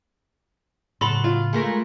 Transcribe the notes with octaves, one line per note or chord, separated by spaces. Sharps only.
A2 C#3 F#3 A4 B5 C6
F4
G#3 A3 A#4